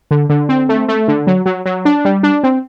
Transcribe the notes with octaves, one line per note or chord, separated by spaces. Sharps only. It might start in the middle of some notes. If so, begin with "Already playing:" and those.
D3
D3
C4
A3
A3
D3
F#3
F#3
F#3
D4
G3
D4
C4